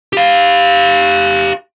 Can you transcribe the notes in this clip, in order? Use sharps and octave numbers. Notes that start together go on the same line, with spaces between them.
G4 F5